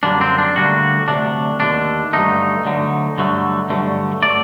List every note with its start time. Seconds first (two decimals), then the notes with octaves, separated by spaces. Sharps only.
0.03 F#2 D3 G3 A#3 D4
0.21 C4
0.38 D4
0.56 D2 D3 G3 A#3 F#4
1.08 D2 C3 F#3 D4
1.60 D#2 D3 A3 D4
2.13 G2 D3 F#3 A3 D#4
2.65 D2 D3 F#3
3.17 G2 D3 F#3 A3
3.70 G2 D3 F#3 A3
4.22 F#3 A3 D5